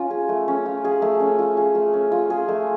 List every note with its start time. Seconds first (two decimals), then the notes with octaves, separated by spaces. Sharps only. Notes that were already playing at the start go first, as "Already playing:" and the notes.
Already playing: C#4 F4
0.10 G#4
0.29 A3
0.48 C#4
0.66 F4
0.85 G#4
1.02 A3
1.20 C#4
1.39 F4
1.57 G#4
1.75 A3
1.93 C#4
2.12 F4
2.30 G#4
2.48 A3